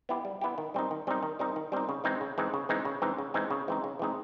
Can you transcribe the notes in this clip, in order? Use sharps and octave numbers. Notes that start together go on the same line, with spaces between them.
B3 E4 G4
G3
B3 E4 G4
D#3
G3 C4 D#4
D#3
G3 C4 D#4
D#3
G3 C4 D#4
D#3
G3 C4 D#4
C#3
E3 G#3 C4 D#4
C#3
E3 G#3 C4 D#4
C#3
E3 G#3 C4 D#4
C#3
E3 G#3 C4 D#4
C#3
E3 G#3 C4 D#4
C#3
E3 G#3 C4 D#4
C#3
E3 G#3 C4 D#4